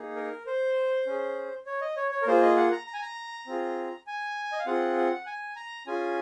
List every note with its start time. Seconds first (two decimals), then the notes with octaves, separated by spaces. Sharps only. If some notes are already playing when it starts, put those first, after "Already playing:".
Already playing: A#3 D#4 G#4
0.16 A#4
0.47 C5
1.07 C#4 G#4
1.66 C#5
1.81 D#5
1.96 C#5
2.11 C#5
2.22 A#4
2.27 A#3 F4 G#4 C5
2.42 D#5
2.57 F#5
2.72 A#5
2.87 A#5
2.93 G#5
3.01 A#5
3.47 C4 F4 G#4
4.07 G#5
4.52 D#5
4.59 F5
4.66 C4 F4 G#4 F#5
4.97 F#5
5.26 G#5
5.56 A#5
5.87 C#4 F4 G#4 G#5